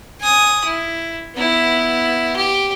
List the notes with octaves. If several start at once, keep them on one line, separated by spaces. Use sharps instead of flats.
G#5 D#6
E4
B3 E4
G4